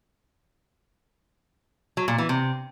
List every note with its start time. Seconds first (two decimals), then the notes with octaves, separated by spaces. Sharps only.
1.97 F#3
2.08 A#2
2.18 E3
2.29 C3